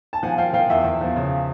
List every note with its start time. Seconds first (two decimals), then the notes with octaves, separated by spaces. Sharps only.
0.13 A5
0.23 F3 F#5 G#5
0.38 F3 F5 G5
0.53 F3 F5 G5
0.69 E2 E5 F#5
0.84 E2
1.01 F3
1.16 C#3